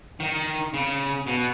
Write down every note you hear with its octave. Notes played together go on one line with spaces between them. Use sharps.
D#3
C#3
B2